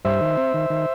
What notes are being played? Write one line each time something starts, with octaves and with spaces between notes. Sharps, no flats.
G2 C5 E5
D#3
C4
D#3
D#3